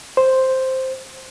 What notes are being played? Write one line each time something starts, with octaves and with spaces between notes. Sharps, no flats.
C5